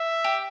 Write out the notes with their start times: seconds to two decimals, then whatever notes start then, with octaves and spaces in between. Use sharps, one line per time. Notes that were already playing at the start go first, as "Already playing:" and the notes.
Already playing: E5
0.24 G4